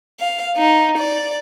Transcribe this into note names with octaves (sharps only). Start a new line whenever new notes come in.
F5
D#4
D5